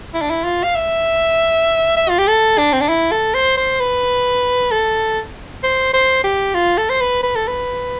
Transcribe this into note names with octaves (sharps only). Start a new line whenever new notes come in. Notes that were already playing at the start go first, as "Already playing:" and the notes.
E4
D4
E4
F4
F5
E5
E5
F4
G4
A4
D4
C4
D4
E4
A4
C5
C5
B4
A4
C5
C5
G4
F4
A4
C5
B4
B4
A4
B4